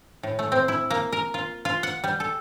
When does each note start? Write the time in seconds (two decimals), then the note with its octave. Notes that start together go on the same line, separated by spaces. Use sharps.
0.23 A2
0.39 A3
0.52 C4
0.68 E4
0.91 A#3
1.13 A#4
1.34 F4
1.65 F4
1.83 F#5
2.04 G3
2.20 A4